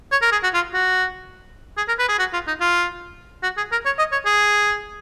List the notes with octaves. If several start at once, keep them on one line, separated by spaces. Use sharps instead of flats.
C#5
A#4
G#4
F#4
F4
F#4
G#4
A#4
B4
G#4
F#4
F4
D#4
F4
F#4
G#4
A#4
C#5
D#5
C#5
G#4